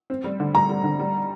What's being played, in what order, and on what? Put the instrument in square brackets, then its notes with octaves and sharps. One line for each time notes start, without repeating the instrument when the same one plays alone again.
[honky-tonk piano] C4
G3
D3
[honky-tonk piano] G3 [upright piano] A#5
[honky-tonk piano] G3
D3
G3